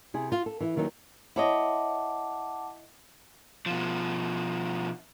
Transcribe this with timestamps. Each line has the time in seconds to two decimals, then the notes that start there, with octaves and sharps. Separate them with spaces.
0.14 C3 E4 G#4
0.32 F4
0.46 A4
0.60 E3 E4
0.76 D#2 D#3 E3 F#3 D#4
1.36 E4 C#5 D#5 F#5 A5 D6
3.66 B2 F3